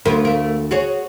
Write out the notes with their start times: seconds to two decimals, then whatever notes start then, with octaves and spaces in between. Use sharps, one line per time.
0.05 D2 B3 F4 A#4
0.25 A3 A#4
0.71 F#4 G#4 C#5